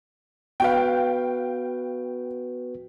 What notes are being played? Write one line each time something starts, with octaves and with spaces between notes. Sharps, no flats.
B3 F#4 B4 F5 G5